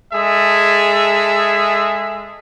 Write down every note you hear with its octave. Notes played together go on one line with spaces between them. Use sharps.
G#3 G#4 A4 E5